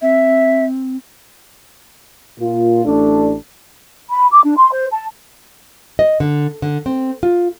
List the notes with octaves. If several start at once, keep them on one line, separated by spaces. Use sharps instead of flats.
C4 E5
A#2 F4
A1 A3 D4
B5
D6
D4
C6
C5
A5
D#5
D3
D3
C4
F4